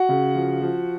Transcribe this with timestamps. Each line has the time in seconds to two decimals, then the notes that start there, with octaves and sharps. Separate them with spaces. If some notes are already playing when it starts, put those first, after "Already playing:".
Already playing: F#4 F#5
0.09 C#3
0.35 F3
0.61 F3